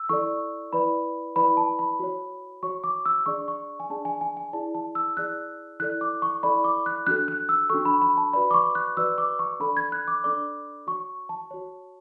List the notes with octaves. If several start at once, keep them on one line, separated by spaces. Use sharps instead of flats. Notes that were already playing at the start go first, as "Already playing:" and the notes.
Already playing: E6
E4 A4 D5 C#6
E4 B4 D5 B5
E4 B4 D5 B5
A5
B5
F#4 C#5
F#4 C#5 C#6
D6
E6
D4 G#4 D5 C#6
C#6
G#5
D4 G#4 D5 A5
G#5
G#5
G#5
E4 G#4 D5 A5
A5
E6
E4 G#4 D5 F#6
E4 A4 D5 F#6
D6
C#6
E4 A4 D5 B5
D6
F#6
D4 F#4 A4 F#6
F#6
E6
D4 F#4 A4 C#6
B5
B5
A5
F#4 B4 D5 B5
D6
C#6
F#6
F#4 B4 D5 E6
D6
C#6
D4 A4 D5 B5
G#6
F#6
D6
D4 A4 D5 D6
F#4 C#5 C#6
A5
F#4 C#5